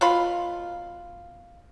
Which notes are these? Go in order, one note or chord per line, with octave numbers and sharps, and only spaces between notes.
B2 F#3 F4 B5